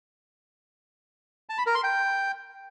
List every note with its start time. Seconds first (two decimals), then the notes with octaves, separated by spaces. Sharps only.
1.49 A5
1.58 B5
1.66 A#4
1.75 C6
1.83 G5